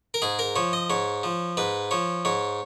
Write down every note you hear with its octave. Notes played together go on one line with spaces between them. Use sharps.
A#4
G#2 G#4
A#4
F3 C#5
D#5
G#2 C#5
F3
G#2 B4
F3 C#5
G#2 C#5